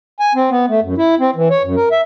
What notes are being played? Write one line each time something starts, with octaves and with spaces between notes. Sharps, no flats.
G#5
C4
B3
A3
F#2
E4
C4
E3
C#5
F#2
A#4
E5